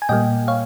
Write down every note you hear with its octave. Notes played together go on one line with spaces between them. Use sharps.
G#5
A#2 G3 A#3 D#5 G5
C#5 F5